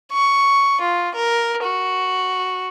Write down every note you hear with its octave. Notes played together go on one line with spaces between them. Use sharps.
C#6
F4
A#4
F#4